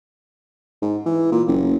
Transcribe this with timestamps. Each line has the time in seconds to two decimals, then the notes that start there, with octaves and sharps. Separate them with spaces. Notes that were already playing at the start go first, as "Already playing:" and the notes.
0.82 G#2
1.06 E3
1.32 A#2
1.48 F#1